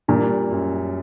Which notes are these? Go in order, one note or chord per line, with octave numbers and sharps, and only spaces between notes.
A#2 G3
F#2